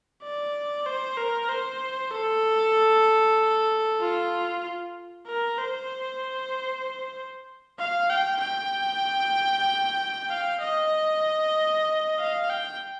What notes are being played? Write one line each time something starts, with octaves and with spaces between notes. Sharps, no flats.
D5
C5
A#4
C5
A4
F4
A#4
C5
F5
G5
G5
F5
D#5
F5
G5